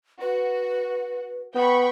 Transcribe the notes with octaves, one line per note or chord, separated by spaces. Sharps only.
F#4 B4
B3 G5 B5 C#6